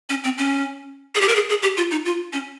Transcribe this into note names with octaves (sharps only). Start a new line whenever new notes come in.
C#4
C4
C#4
G#4
G4
A#4
G#4
G#4
G4
F4
D#4
F4
C#4